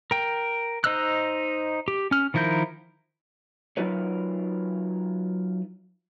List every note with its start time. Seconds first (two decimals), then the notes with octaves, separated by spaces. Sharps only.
0.11 A#4 G5
0.84 D#4 C5 D#5 E6 F#6
1.88 G4
2.11 C#4 F6
2.34 D#3 F3 E4 A#4 G6
3.77 F#3 D#4 F4 A#4 B4 C#5